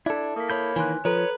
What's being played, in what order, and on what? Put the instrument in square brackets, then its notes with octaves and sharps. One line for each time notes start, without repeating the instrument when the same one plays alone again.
[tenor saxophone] D4 [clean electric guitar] E4 A4 [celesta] G#6
[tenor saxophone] A#3 [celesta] D#6 B6
[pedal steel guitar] C#5 B5 G6
[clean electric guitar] D#3 E3 [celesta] G#5 C6 F#6
[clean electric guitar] F3 [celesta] A4 A#5 [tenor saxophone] B4 [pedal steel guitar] C#5